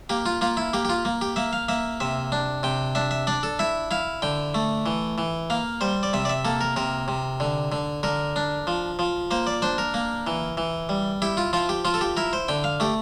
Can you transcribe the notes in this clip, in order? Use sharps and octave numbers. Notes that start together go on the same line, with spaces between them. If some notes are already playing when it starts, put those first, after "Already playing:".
A#3 G4
F4
A#3 F4
E4
A#3 G4
G4
F4
A#3
G4
A#3 E5
F5
A#3 E5
C3 E5
D4
C3 G5
D4 E5
E5
D4 D5
A4
E4 E5
E4 F5
D3 G5
A3
E3
E3
A#3 F5
G3 C5
D5
C3 E5
D5
E5
A#3 A4
A#4
C3 A#4
C3
D3
D3
D3 A#4
D4
F3
F3
A#3 C5
D5
D4 C5
A#4
A#3
E3
E3
G3
E4 G4
F4
F3 F4
G4
F3 F4
A4
G4
E4 A#4
C5
D3 G5
F5
A3 G4